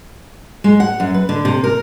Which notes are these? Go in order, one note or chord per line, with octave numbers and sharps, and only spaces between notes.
G#3
F#5
F#2
B4
D3
C3
A#4